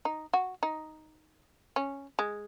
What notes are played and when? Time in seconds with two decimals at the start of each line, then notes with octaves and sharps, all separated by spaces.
0.05 D#4
0.33 F#4
0.63 D#4
1.76 C#4
2.19 G#3